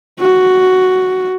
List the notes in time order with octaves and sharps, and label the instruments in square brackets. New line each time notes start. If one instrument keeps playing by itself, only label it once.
[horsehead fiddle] F#4